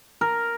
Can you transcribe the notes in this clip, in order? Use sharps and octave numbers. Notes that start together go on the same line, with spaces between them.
A#4